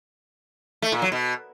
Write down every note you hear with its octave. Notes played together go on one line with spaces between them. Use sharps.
A3
A#2
F#3
B2